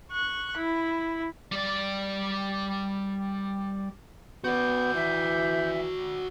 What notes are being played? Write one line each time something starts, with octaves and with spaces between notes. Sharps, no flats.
C#6 F#6
E4
G3 D5
B3 F#4 D5 G6
E3 E5